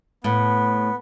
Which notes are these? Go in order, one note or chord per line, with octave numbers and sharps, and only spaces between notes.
A2 B3